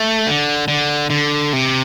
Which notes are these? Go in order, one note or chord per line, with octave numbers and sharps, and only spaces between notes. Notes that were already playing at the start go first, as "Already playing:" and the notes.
Already playing: A3
D3
D3
D3
C3